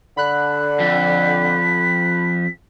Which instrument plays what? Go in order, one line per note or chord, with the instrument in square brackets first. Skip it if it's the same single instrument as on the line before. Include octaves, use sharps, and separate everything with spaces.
[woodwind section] D3 [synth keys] B5 F#6
[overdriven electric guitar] F2 [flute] B6